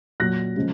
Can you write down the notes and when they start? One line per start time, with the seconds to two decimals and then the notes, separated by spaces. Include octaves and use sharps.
0.20 A#2 F#3 F#6 A#6
0.56 C#3 F3 G#3